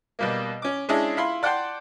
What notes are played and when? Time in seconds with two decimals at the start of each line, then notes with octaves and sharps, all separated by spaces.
0.19 B2 G3 A#3
0.62 C#4 D6
0.89 G#3 C#4 D4 E4 G#4
1.17 E4 F4 B5 C6
1.43 D5 F#5 G5 A5 C6